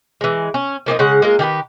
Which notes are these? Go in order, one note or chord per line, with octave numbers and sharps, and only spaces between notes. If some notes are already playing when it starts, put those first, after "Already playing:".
E3 G#3
C#4
F3 A#3 C4 D#4
C#3 G#3 F#5
G#3 A#3 F4
D#3 G4 G#4 B4